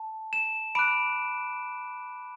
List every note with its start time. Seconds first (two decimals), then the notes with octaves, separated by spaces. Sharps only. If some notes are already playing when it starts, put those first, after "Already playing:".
Already playing: A5
0.33 E7
0.75 B5 D6 F#6 D7